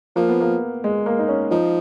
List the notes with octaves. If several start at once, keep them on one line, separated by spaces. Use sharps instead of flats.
F3 A#3
B3
A#3
G#3
A#3
D#4
C#4
F3 D#4